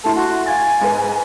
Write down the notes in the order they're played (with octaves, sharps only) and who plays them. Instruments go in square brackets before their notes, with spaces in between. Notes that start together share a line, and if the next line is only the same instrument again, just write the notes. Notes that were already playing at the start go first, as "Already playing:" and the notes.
[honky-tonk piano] A3 E4 C6 [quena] A5
[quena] F#4
[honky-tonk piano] F5 G#6 A6 [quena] G#5
[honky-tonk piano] G#2 B4